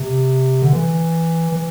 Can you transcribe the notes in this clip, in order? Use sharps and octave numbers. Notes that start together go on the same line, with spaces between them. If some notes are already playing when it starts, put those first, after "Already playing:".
Already playing: C3
D3
E3
E3